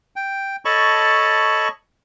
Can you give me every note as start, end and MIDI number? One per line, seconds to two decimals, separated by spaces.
0.16 0.56 79
0.65 1.68 69
0.65 1.68 73
0.65 1.68 75
0.65 1.68 81
0.65 1.68 83
0.65 1.68 85